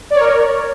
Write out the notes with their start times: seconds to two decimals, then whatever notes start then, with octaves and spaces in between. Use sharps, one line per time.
0.10 D5
0.15 C#5
0.20 A#4